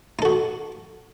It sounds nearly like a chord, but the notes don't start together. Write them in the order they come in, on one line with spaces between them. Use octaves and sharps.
D#4 A4 F#4